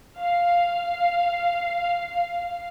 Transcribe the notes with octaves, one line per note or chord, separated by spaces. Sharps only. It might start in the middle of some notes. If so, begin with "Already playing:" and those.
F5 C7